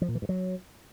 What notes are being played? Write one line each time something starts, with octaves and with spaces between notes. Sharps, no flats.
F3
A#2
E3
G2
F#3